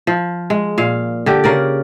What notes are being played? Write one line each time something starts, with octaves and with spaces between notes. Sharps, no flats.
F3
G#3
A#2 F5
D3 G4
C#3 A#4 D5